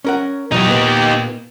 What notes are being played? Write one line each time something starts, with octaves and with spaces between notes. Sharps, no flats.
C#4 A#4 F#5
B2 E3 F#3 D#4 G4
A#2 A#3 B3